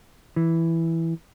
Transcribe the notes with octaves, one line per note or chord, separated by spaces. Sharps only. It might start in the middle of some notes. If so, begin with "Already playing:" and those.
E3